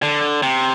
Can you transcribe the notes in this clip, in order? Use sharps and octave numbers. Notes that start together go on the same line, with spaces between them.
D3
C3